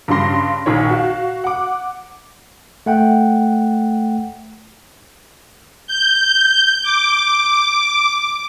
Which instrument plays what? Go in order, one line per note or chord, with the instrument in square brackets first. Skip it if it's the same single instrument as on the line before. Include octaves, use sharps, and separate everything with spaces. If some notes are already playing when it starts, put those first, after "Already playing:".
[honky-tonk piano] G2 C#3 G3 C6 A#6
A#1 D#3 C#5
F#4 F5
F#5 D6
[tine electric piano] A3 F#5 G5
[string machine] G6
D6